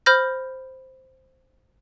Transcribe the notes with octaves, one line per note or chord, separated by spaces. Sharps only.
C5 B5 F6 G6 A#6